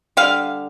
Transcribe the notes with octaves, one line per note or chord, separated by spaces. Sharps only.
D3 G3 F5